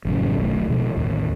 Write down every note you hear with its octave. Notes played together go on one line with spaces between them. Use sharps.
A1 F#2 C#3
D#1 B1 A3
B2 F3 G#3
A1 D#2